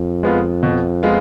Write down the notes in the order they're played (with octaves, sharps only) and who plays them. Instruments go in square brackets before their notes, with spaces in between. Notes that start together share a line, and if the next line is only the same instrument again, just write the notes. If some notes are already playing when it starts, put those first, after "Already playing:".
Already playing: [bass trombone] F2
[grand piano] G#3 B3 F4
B2
G#3 B3 F4